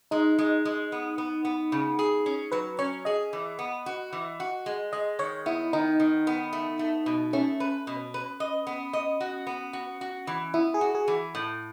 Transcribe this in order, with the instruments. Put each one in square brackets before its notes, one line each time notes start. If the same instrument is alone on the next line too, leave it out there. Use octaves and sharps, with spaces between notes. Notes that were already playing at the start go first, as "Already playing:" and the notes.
[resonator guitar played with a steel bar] G#3 [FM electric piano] D#4
[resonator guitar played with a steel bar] G#3
G#3
B3
B3
B3
C#3
G#4
C#4
[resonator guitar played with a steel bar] F#3 [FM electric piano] B4
[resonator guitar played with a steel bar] C#4 [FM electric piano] C#5
[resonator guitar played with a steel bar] G#4 [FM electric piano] D#5
[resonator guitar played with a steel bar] E3
B3
F#4
E3
F#4
G#3
[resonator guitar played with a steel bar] G#3 [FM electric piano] D#5
[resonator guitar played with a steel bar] D#3 [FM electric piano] C#5
[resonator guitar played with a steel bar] B3 [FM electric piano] E4
[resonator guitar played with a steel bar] D#3 [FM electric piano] D#4
[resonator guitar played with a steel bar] D#3
B3
A3
A3
B2
[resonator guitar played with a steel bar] A3 [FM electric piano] C#4
[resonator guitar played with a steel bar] B4
B2
B4
D#5
B3
D#5
F#4
B3
F#4
F#4
E3
[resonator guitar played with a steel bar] B3 [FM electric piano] E4
[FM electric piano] G#4
[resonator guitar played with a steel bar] F#4
[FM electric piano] G#4
[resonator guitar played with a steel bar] E3
A2